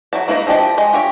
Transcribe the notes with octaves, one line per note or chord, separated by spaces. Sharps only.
F#3 E4 A5
A#3 E4 B4 C#5 D#5
F3 E4 G4 D#5 A5
G#3 D#5
F4 G4 C#5 E5